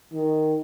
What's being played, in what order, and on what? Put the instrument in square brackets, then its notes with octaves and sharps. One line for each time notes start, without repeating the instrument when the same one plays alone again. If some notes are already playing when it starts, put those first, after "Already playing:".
[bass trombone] D#3